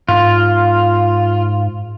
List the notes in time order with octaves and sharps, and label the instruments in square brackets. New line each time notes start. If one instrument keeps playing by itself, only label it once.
[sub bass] G#2 [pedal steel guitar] F4